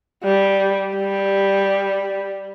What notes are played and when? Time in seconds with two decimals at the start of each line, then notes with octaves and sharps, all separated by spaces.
0.24 G3
0.97 G3